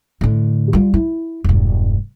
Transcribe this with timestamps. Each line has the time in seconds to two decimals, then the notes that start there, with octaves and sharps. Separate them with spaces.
0.21 A2 D3
0.73 G3 F4
0.94 E4
1.44 E1 G2